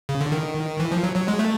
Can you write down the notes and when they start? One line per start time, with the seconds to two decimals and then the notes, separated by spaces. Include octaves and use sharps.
0.09 C#3
0.21 D3
0.32 D#3
0.80 E3
0.92 F3
1.03 F#3
1.16 F#3
1.28 G#3
1.39 A3